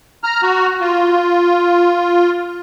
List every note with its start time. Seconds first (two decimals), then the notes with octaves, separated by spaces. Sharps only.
0.24 A#5 F6
0.42 F#4
0.81 F4